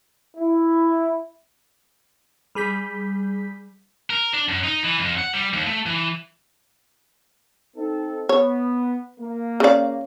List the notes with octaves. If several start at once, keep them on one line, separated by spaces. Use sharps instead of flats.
E4
G3 G#4 G6 B6
A#4
D4
F#2
D#4
E3
F2
F#5
G3
D#2
A3
E3
C4 D#4 A4
B3 C#5
A#3
C#3 D5